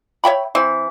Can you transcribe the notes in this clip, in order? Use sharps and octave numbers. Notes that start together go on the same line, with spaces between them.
C#5 E5 G5 B5
E3 C4